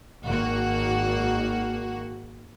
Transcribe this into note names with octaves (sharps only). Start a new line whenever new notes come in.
G#1 A#3 F#4